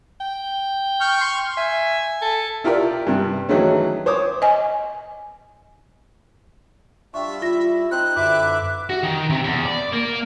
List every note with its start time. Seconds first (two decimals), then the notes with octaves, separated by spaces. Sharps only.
0.21 G5
1.01 C#6 F6 G6
1.21 C6
1.57 E5 G#5
2.22 A4
2.64 E4 F4 G4 A#4 D5
3.07 G2 C3
3.49 D#3 E3 F#3 G#3 A3 C#4
4.06 C5 C#5 D6 D#6
4.42 D#5 G#5
7.14 G3 D4 F4 E5 G5 C#6
7.42 E4 F4 E6 A#6
7.91 C4 D#4 C5 F#6
8.16 F#2 D3 E4 B4 E5 D6
8.90 F#4
9.03 D#3
9.30 C3
9.44 E2
9.66 D5
9.93 A#3